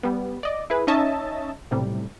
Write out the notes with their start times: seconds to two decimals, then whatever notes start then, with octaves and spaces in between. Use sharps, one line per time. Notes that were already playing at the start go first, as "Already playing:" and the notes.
0.03 G3 B3
0.43 D5 D#5
0.70 E4 G#4 B4
0.87 C#4 D#4 C#5 D#5 E5 A5
1.71 B1 A2 C3 G3